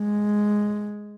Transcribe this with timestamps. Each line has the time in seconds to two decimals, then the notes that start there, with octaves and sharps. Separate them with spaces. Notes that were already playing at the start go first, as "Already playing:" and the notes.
Already playing: G#3